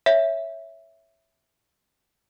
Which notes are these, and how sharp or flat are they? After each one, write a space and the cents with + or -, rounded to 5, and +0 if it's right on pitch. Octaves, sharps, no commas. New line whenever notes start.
C#5 +0 E5 +0